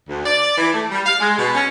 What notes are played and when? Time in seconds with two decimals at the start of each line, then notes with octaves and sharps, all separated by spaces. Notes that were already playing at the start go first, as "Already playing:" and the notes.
0.09 D2
0.26 D5
0.58 E3
0.74 A3
0.91 G3
1.06 F5
1.20 G#3
1.38 B2
1.55 C#4